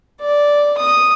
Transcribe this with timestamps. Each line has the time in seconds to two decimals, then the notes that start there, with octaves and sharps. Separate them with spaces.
0.21 D5
0.78 D#6